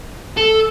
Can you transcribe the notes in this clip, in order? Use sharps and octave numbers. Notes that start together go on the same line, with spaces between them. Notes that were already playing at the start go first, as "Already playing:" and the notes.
A4